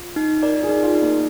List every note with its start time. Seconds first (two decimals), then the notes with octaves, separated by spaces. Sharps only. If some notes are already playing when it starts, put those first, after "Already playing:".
Already playing: F4
0.16 D#4
0.42 A#4 D5
0.63 G#4
0.69 D#4
0.83 F4
0.95 D#4
1.02 A#3